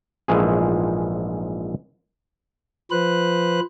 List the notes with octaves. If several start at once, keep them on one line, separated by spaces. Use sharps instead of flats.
A#1 G#2 E3 F3 A3 G#4
F3 B4 C5 F#6